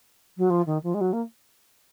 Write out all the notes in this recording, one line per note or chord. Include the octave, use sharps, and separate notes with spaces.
F#3
F3
D#3
F3
G#3
F#3
A#3